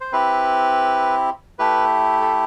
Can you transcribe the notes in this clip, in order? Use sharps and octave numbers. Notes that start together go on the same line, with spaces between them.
C5
C4 E4 G4 B4
A3 E4 G4 B4
A4